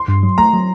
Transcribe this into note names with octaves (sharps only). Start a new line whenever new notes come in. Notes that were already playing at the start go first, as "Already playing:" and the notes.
Already playing: C6
G2
F#3
A3 A#5
F#3